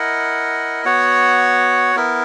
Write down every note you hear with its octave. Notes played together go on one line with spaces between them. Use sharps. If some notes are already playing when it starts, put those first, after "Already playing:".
Already playing: E4 A#4 D#5 F#5
B3 F#4 C#5 F#5
B3 E4 A#4